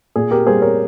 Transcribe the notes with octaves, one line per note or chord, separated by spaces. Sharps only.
A#2 G#4
G4 A#4
G3 A#3 G#4 C5
A#4 C#5